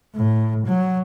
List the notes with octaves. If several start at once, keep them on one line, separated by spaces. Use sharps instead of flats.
A2
F#3